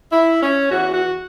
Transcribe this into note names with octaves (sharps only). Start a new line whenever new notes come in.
E4
C#4
E2 E3 F#4
F#4